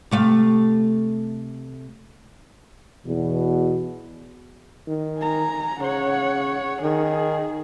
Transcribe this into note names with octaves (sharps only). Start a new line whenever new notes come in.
C3 A3 F5
E2 B2
D#3
G#5 A#5
C#3 C#5 F#5
D#3 G#4